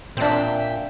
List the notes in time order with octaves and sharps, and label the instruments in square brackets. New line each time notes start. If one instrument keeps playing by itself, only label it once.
[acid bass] A#2 [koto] C4 D4 [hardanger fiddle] E5 G5